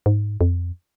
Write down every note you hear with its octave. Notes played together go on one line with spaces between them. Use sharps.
G#2
F2